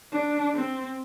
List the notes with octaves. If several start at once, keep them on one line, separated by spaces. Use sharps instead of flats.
D4
C4